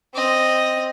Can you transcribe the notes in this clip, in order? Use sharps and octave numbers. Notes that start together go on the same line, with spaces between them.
C4 D#5